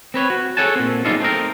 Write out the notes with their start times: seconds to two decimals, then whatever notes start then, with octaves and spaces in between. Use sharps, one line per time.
0.14 C4 B4 C#5
0.30 F#4
0.57 G#4 A4 C#5 F#5 G#5 A5
0.75 A#2 C4
1.05 F#2 C#3 G3 D#4 F4 A4
1.20 A3 C4 D#4 A#4